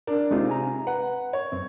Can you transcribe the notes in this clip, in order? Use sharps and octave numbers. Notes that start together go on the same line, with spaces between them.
D4 A#4
C3 G#3 D#4 F4
G#5 A#5
B4 F#5
C#5
F#2 C4